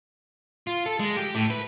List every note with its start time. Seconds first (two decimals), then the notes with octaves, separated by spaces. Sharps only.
0.67 F4
0.86 A4
1.00 G#3
1.17 G4
1.35 A2
1.50 B4